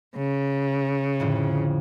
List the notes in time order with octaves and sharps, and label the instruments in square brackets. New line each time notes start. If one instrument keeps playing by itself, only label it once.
[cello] C#3
[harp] F2 A2 D3